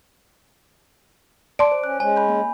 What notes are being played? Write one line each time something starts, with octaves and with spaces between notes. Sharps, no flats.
D5 A5 C6 D6 D7
C5
C#4 F#6
G#3 C#4 C#5 G#5
B5 G6
A#3